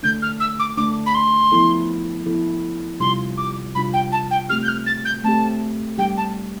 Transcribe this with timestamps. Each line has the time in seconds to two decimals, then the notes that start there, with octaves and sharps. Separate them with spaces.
0.03 D3 A3 D4 G6
0.22 F6
0.40 E6
0.59 D6
0.77 D3 A3 D4 D6
1.06 B5
1.14 C6
1.52 F3 B3 E4 A4
2.26 F3 B3 E4 A4
3.00 C3 G3 D4 F4 C6
3.37 D6
3.75 C3 G3 D4 F4 B5
3.93 G5
4.12 A5
4.31 G5
4.49 A3 C4 G4 F6
4.63 G6
4.68 F6
4.86 A6
5.05 G6
5.24 A3 C4 G4 A5
5.98 G3 D4 G4 G5
6.17 A5